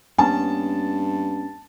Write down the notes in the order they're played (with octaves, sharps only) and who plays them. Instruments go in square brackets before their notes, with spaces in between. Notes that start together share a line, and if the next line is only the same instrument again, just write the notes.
[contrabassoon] G2 [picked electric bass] A#3 B3 C#4 [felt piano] A5